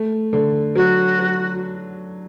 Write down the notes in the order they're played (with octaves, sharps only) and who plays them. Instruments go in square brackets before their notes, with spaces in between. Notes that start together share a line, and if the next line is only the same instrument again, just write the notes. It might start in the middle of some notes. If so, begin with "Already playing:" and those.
Already playing: [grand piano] A3
D3
[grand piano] F#3 [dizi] F#4
[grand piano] F#3